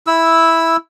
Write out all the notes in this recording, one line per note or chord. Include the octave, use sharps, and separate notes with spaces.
E4 E6